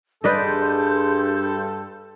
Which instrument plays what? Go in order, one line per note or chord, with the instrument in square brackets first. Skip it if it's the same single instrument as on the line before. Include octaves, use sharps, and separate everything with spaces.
[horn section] G2 A4 [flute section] G#4 C6 G6 [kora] B4 D5 D#5